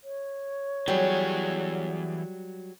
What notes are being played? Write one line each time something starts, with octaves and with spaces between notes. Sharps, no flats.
C#5
E3 F#3 G3 G#4